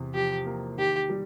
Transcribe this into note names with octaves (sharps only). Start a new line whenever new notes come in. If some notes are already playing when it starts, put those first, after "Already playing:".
Already playing: E2 C3
F3 G4
A#3
D#3 G4
G3